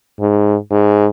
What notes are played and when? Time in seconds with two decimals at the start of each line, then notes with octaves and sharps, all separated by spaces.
0.20 G#2
0.71 G#2